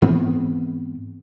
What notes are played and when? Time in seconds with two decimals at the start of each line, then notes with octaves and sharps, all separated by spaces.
0.02 G#2 E3 B3 C4